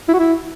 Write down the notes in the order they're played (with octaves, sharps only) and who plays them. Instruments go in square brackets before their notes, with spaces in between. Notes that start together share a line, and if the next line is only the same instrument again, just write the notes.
[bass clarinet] E4
F#4
E4